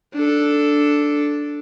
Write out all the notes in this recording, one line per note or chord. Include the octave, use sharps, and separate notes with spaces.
D4 A4